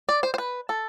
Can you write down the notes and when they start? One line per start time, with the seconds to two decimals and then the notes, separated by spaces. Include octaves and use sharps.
0.09 D5
0.23 C5
0.34 C5
0.38 B4
0.69 A4